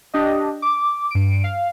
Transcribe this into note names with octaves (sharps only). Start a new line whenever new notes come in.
D4 G4 D#5
D6
G2 D7
F5